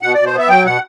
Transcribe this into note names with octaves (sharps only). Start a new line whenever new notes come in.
B2 F#5
B2 D5
C5
B3 E5
F#3 G5
B2 F#5